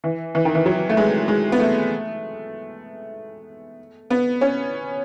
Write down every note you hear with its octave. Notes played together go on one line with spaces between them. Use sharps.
E3
E3
D#3
E3
F#3
A3
G#3
G#3
B3
A3
B3
C#4